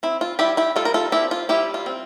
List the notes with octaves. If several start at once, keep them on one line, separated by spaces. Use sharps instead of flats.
C4 E4
F4
G3 E4 G4
E4 G4
G3 F4 A4
A#4
F4 A4
C4 E4 G4
F4
G3 E4 G4
F4
C4